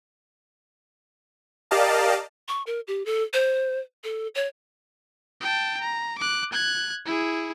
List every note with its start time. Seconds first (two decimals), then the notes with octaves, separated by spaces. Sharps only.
1.71 G4 A#4 D5 D#5 F5 A5
2.48 C#6
2.67 A#4
2.87 G4
3.06 A4
3.33 C5
4.04 A4
4.35 C#5
5.41 G5 A5
5.81 A#5
6.18 D6 F#6
6.52 F#6 G#6
7.06 E4 G#4